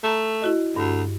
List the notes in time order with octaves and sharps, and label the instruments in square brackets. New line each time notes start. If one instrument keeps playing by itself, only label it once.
[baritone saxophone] A3 [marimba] A5 A#5
[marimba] E4 F#4 D#5
[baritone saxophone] D2 [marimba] G2